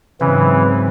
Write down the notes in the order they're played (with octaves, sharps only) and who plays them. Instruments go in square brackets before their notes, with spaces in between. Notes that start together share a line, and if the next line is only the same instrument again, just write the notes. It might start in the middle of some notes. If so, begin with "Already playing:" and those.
[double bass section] G#2 F#3 C4 [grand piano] C#3 [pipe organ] E3